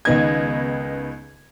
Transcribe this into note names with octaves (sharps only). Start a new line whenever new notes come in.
C#2 D#3 B3 D#5 G#6